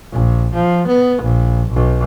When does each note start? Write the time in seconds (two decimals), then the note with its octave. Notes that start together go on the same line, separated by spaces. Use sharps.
0.12 A#1
0.54 F3
0.87 B3
1.23 A#1
1.70 B1